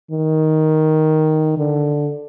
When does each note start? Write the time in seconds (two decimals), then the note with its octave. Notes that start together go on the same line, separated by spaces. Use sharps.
0.11 D#3
1.57 D3